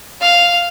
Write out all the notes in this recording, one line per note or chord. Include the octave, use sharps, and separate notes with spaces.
F5